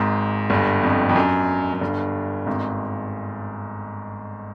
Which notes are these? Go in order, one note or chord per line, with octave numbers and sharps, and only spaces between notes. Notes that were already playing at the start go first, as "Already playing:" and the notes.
Already playing: G#1 G#2
G1 G2
F2
F2
F#2
F#2
G1 G2
G#1 G#2